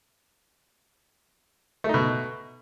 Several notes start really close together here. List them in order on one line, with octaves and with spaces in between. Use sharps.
A3 D#4 B2